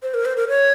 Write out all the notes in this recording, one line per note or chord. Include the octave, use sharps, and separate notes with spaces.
C5
A#4
C5
A#4
C#5